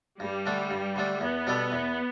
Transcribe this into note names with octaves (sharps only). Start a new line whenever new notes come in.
G2 G3
D3 A3 D4
G2
D3 A3 D4
E2 B3
B2 G3 D4 A4
E2